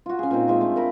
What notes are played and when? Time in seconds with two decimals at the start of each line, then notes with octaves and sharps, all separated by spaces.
0.06 F4 F#4
0.19 C#4 G#4
0.31 A#2 C4 D#4
0.48 G#3 F4 E5
0.61 A3 D4
0.76 A#4 A#5 B5